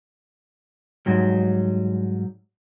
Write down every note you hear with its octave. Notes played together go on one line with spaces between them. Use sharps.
G#2 F#3 G3